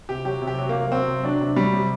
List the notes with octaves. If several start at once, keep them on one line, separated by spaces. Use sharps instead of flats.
C3 G4
F#3 G4
C3
G4
F#3
A#3
C3
F#3 C4
C3
F#3 D4
C3
F#3 G3
C3